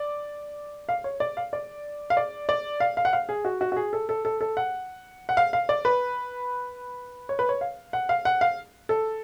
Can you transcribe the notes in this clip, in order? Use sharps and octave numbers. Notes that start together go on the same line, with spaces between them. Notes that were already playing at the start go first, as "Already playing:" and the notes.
Already playing: D5
F5
C#5
D5
F5
D5
F5
D5
D5
F5
F5
F#5
F5
G#4
F#4
F#4
F#4
G#4
A4
A4
A4
A4
F#5
F#5
F5
F5
D5
B4
C#5
B4
C#5
F5
F#5
F5
F#5
F5
A4